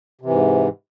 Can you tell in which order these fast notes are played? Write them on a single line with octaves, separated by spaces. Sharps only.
C3 E3 G#2